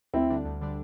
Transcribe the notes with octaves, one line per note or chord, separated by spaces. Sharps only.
D2 C4 E4
D3 G3 D4
D2
D3 G3 D4